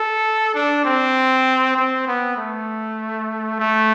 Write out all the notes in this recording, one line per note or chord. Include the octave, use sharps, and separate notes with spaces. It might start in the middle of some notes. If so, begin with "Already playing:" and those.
Already playing: A4
D4
C4
C4
B3
A3
A3